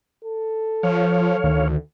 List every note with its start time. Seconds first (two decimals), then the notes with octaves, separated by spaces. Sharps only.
0.24 A4
0.83 F3 C#5 F5
1.44 D2 D#3